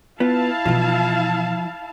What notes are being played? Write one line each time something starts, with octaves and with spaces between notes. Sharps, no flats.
B3 E4 F4 F5 A5
B2 E3 F3 F4